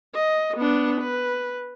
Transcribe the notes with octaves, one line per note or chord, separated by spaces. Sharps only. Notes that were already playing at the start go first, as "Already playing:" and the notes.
D#5
B3 D4
B4